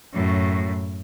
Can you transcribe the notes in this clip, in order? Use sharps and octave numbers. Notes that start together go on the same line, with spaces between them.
F#2 A2